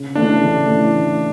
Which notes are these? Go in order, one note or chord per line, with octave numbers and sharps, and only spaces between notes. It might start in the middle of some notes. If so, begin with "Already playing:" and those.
Already playing: C#3
E3 A3 D4
C#3
E3 A3